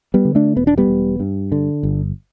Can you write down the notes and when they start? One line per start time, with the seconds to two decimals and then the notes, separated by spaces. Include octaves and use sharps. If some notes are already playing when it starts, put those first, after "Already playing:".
0.14 G3 B3
0.25 D3
0.35 A3 D4
0.57 E1 B3
0.67 D4
0.78 G3 B3
0.87 E1
1.20 G2
1.52 D3
1.83 G1